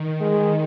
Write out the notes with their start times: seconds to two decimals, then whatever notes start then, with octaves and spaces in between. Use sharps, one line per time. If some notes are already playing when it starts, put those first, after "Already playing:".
Already playing: D#3
0.21 G#3